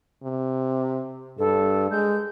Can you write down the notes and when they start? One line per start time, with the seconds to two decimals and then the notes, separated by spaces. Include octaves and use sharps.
0.23 C3
1.38 G2 A4
1.91 G#3 G6